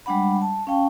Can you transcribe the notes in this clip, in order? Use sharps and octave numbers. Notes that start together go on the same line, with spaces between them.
G3 G#3 D4 F#5 B5
A5
C#4 F5 G5 A5 C#6